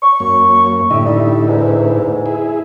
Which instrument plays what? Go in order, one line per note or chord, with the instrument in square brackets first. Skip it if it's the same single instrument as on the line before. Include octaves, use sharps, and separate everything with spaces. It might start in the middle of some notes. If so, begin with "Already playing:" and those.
[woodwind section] C#6
[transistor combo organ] F#2 A#3 C#4
[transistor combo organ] A2 D3 E4 [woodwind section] G4 D#5 E5
[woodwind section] G3 D#4
E2 G#2
[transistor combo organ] E4 G#4